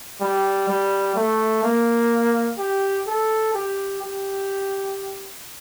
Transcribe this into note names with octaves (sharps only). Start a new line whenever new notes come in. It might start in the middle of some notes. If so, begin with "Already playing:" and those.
G3
G3
A3
A#3
G4
A4
G4
G4